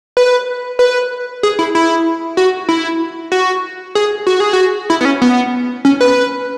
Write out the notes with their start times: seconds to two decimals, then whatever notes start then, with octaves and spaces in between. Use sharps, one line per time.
0.17 B4
0.79 B4
1.43 G#4
1.59 E4
1.75 E4
2.37 F#4
2.69 E4
3.32 F#4
3.95 G#4
4.27 F#4
4.40 G#4
4.53 F#4
4.90 E4
5.01 B3
5.05 C#4
5.22 B3
5.85 C#4
6.01 B4